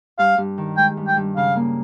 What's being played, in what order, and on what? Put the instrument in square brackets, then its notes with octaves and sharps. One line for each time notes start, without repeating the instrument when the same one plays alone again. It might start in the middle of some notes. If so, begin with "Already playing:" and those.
[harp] G2 [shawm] F5
[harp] G2
D#3
[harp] G#3 [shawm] G5
[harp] G2
[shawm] G5
[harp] G2
[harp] C#3 [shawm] F5
[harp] A#3